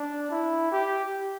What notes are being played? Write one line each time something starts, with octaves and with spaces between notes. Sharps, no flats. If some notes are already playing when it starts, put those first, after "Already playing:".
Already playing: D4
E4
G4